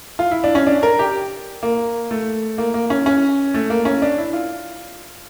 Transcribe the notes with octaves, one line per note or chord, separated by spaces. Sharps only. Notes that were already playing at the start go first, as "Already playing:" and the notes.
F4
E4
D4
C#4
D4
A#4
G4
A#3
A3
A#3
A#3
C#4
C#4
A3
A#3
C#4
D4
E4
F4